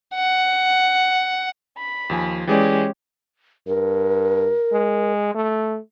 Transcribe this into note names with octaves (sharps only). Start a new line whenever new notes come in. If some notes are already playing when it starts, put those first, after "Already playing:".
F#5
B5
D#2 F3 G#5
E3 G#3 C#4 G4 G#4 D5
G2 A#4
G#3
A3